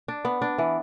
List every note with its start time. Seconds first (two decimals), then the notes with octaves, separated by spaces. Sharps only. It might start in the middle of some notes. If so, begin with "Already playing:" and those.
0.08 D4
0.25 B3
0.42 D4
0.58 E3